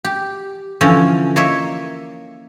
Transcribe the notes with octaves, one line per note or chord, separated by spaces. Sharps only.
G4
D3 E3 F3 C#4
A#3 C#5 D#5 E5